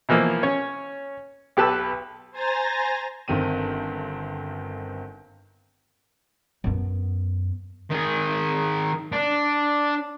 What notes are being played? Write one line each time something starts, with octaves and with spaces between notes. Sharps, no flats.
B2 E3 F3 A#3
C#4 C#5
B1 G4 B4 A5 E6
C5 G#5 A#5 A6 A#6
G1 D#3 C4 D#7
F#2 B3
D#3 G#4
D4